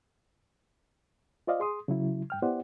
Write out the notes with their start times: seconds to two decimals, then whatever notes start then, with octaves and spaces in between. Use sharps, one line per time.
1.47 F4 C5 D5 D#5 F5
1.60 G#4 C6 D#6
1.88 C#3 F#3 E4
2.30 G2 G5 F6
2.42 B3 E4 G4 C5 D5 F#5